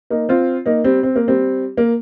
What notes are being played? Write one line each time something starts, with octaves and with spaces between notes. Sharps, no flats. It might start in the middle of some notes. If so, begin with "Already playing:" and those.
A#3 D#4
C4 F4
A#3 D#4
G3 C4
C4
A#3
G3 C4
A#3